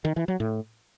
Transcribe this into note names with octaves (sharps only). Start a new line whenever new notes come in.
D#3
E3
F#3
A2